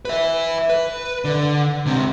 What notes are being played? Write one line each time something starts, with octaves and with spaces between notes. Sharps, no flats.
B4 E5
B4
D3
C#2 C3